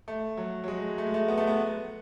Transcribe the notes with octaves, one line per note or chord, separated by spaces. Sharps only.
A3
F#3
F#3
G#3
A3
G#3
A3
B3
A3
B3